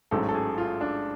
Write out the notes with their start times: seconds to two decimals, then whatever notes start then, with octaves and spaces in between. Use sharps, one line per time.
0.11 A1 G#2 F#3 A3 C#4 A4
0.29 A4
0.34 G#4
0.58 F4
0.81 D4